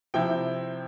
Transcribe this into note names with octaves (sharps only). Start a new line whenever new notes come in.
C3 F3 C4 E4 G5